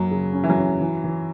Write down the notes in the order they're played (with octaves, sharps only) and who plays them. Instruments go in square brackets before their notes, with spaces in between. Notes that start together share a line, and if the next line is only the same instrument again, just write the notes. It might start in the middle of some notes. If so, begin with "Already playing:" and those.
Already playing: [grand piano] F#2 A#3 [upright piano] F#3
[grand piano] C#3
C#4
[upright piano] E3
F#3
[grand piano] C#4
E3
E3